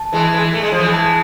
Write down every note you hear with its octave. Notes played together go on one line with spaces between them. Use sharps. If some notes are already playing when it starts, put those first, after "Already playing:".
Already playing: A5
E3 G#3
E3 G#3
A3
G#3
F3
E3 G#3
A5